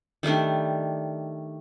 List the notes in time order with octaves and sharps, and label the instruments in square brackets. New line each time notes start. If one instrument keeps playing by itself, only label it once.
[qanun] D#3 G3 A3 D4